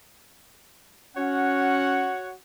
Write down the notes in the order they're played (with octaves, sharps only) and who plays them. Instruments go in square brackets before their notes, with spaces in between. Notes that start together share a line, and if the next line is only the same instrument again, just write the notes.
[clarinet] C#4 [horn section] F#4 C#5 F#5